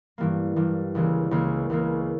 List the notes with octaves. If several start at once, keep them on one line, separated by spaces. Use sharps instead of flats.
G2 E3 G3 A#3
G2 E3 G3 A#3
C#2 C#3 E3 A#3
C#2 C#3 E3 A#3
C#2 C#3 E3 A#3